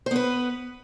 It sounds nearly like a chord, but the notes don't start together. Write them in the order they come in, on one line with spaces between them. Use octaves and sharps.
C5 B3 B4